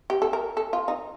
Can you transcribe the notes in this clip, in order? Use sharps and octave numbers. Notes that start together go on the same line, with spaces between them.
G4
A4
A#4
A4
F4
D#4